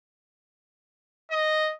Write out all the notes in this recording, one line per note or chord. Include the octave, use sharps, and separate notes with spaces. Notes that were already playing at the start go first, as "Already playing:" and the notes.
D#5